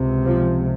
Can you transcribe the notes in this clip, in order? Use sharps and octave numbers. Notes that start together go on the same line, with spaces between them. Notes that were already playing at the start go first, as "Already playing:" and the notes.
Already playing: C#2 C3
F3